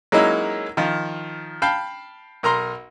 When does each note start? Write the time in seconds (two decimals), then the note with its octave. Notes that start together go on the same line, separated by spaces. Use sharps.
0.12 F#3 G#3 A#3 C#4 D#4 E4
0.77 D#3 F3
1.62 F5 G5 A5 B5
2.43 B1 A#4 A#5 C6